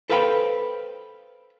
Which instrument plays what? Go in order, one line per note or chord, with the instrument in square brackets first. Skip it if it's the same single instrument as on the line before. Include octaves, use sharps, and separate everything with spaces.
[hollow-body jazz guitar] A4 B4 C5 F5 G5 B5